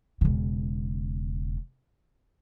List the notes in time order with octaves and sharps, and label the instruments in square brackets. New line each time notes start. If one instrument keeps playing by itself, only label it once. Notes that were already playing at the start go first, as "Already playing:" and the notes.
[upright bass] E1 C#3